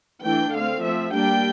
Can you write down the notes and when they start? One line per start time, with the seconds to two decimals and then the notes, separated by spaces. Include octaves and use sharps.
0.23 E3 A3 D4 G5
0.53 D3 A3 C4 F5
0.83 F3 C4 E5
1.14 G3 A#3 D4 G5